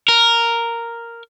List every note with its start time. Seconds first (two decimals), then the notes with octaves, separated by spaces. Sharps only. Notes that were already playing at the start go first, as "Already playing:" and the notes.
0.08 A#4